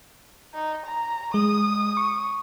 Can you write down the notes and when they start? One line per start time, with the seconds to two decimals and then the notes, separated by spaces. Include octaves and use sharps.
0.54 D#4
0.86 A#5
1.34 G#3 D#6
1.97 C#6